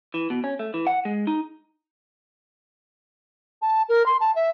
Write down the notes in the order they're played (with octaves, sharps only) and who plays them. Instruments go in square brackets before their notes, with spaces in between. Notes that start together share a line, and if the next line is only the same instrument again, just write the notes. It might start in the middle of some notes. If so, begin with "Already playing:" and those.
[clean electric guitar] E3
B2
C#4
A3
E3
F#5
G#3
D#4
[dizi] A5
A#4
C6
A5
E5